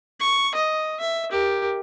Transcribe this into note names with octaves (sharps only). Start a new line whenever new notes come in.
C#6
D#5
E5
G4 A#4